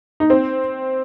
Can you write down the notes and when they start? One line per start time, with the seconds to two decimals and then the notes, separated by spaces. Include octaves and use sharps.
0.20 D#4
0.30 C4